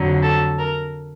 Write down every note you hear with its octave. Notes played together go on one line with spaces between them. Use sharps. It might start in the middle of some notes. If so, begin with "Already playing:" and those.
Already playing: F2 D3 F#3
A4
A#4